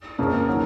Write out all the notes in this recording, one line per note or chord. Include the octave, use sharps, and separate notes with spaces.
F2 C#3 F3 A#3 C#4
D#3 F#3 A#3